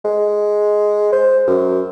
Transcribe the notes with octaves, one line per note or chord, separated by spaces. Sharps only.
G#3
C5
F#2